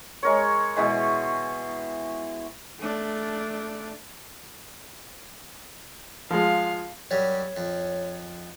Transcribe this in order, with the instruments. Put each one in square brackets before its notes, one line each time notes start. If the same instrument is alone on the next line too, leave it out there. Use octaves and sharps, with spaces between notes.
[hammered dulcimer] G#3 A#4 C#5
B2 E3 G#3
[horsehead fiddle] A3 D4
[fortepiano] F3 G#3 [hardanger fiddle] F5
[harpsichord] F#2 G3 [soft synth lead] C#5
[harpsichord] F2